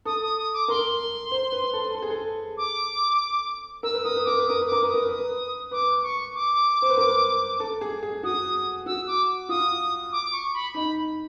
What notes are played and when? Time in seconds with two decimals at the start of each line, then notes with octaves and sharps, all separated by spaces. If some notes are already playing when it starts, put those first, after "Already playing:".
0.05 A4 D#6
0.21 D#6
0.37 D#6
0.53 D6
0.68 A#4 C6
1.31 C5
1.52 B4
1.73 A4
1.94 A4
2.02 G#4
2.10 A4
2.57 D6
3.83 A#4 E6
3.94 B4
4.03 A#4 D#6
4.16 B4
4.25 A#4 D6
4.39 B4
4.46 A#4 D#6
4.61 B4
4.66 D6
4.72 A#4
4.83 B4
4.88 D#6
4.94 A#4
5.09 B4 D#6
5.71 B4 D6
6.02 C#6
6.34 D6
6.82 C5
6.90 B4
6.97 A#4
7.60 A4
7.81 G#4
8.03 G#4
8.23 F#4 D#6
8.86 F#4 E6
9.07 D6
9.49 F4 D#6
10.12 D6
10.32 C#6
10.53 B5
10.74 D#4 B5